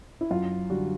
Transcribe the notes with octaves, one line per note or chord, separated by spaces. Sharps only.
E4
F#2 F4
D3 G3 F#4